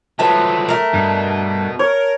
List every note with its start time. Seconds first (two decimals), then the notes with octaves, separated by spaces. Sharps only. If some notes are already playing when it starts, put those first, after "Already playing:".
0.19 F3 F#3 A3 B4 A5
0.68 A3 A#4
0.93 G2 B2
1.79 A#4 C#5